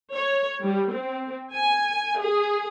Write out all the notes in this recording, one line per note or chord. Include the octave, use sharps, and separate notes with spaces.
C#5
G3
C4
G#5
G#4